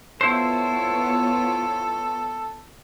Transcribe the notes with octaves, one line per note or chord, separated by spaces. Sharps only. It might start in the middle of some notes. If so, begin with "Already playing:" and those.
B3 E4 F4 A4 C5 C#5